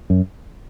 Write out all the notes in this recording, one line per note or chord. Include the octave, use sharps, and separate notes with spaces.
F#2